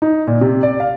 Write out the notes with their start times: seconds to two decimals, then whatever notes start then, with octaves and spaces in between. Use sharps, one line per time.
0.02 D#4
0.27 A#2
0.41 C3
0.63 D5
0.80 F5